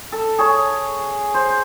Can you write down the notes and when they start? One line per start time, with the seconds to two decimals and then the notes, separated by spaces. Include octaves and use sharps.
0.12 A4
0.38 G#4 C#5
1.34 C5